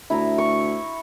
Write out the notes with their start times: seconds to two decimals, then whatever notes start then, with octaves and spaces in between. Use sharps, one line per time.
0.10 D2 E4 A#5
0.38 C#6